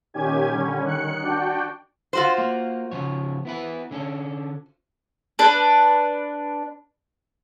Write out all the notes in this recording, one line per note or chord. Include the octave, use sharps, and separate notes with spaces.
A#2 D#3 C#4 G4 G#5 G#6
D3 G3 C#4
D#3 F#6 C#7
D4 F#4 D5 G5
F4 F#4 C5
A#3 F5
C#3 F3 C#5
B3 E4 B4
D3 C#4 D4
D4 B4